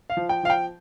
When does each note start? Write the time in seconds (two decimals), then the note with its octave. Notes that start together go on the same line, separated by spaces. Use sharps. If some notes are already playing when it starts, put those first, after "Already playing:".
0.10 F5
0.17 F3
0.29 G5
0.43 F3 F5
0.50 G5